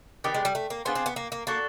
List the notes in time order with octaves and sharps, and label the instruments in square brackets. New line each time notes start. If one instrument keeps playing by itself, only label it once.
[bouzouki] D#3 [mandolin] B3 D4 G4
[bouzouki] G#3
G3
A3
A#3
[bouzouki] B3 [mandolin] D4 F4 G#4 C5
[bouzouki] C4
B3
A#3
A#3
[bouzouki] A#3 [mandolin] D4 F#4 A4